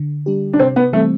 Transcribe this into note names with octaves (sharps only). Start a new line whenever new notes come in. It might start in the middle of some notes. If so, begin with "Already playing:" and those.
Already playing: D3
G3 D4 G4
D4
C3 C4
B3
E3 G3 A3 C4